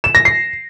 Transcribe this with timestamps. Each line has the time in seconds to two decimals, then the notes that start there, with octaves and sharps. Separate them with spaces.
0.04 E7
0.15 A#6
0.25 C7